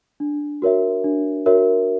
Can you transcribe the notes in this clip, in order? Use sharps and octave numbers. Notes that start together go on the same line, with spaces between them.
D4
F#4 A#4 C#5 E5
D4
F#4 A#4 C#5 E5